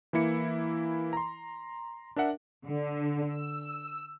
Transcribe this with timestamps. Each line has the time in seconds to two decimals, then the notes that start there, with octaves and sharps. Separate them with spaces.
0.13 E3 A#3 E4 C#7
1.13 A#5 C6
2.16 D4 A#4 E5 F#5
2.68 D3
3.33 E6